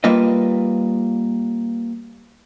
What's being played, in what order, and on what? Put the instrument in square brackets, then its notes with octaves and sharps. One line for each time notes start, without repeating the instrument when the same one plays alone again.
[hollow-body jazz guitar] G3 A#3 F4 B4 D#5